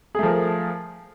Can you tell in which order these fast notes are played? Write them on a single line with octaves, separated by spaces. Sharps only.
G#4 A3 F3 A#4